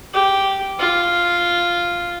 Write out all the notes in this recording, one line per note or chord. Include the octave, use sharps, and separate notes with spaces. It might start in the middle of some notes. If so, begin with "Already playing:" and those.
G4
F4